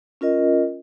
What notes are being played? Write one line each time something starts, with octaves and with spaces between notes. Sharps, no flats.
C#4 F4 A#4 D#5